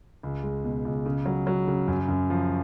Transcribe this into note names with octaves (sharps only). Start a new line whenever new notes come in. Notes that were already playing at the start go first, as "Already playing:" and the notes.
C#2
G#3
B2
C#2
C#3
F#3
F#3
C#3
F#2
F#2
F3